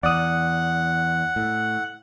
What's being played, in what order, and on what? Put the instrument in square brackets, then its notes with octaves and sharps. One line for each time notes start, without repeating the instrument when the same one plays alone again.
[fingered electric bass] E2 [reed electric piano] D5 D#6 [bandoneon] F#5
[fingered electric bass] A2